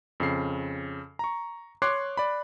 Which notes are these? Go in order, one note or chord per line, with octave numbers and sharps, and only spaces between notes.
F2 C#3 C7
A#5 C#6
C#5 C6 D6 F#6 C7
D5 B5